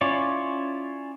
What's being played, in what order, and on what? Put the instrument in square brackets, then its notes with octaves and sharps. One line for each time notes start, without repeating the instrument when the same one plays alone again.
[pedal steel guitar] C#4 E4 F4 C#5 D5